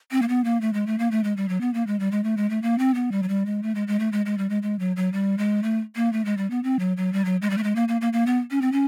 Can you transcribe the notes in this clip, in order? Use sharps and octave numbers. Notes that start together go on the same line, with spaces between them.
C4
A#3
B3
A#3
A3
G#3
A3
A#3
A3
G#3
G3
F#3
B3
A#3
G#3
G3
G#3
A3
G#3
A3
A#3
C4
B3
G3
F#3
G3
G#3
A3
G#3
G#3
A3
G#3
G#3
G3
G#3
G#3
F#3
F#3
G3
G#3
A3
A#3
A3
G#3
G3
B3
C4
F#3
F#3
G3
F#3
G#3
G3
A3
G#3
A#3
A#3
A#3
A#3
B3
C#4
C4
C#4